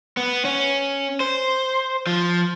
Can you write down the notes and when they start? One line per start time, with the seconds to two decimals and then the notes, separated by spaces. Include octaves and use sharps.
0.17 B3
0.45 C#4
1.20 C5
2.07 F3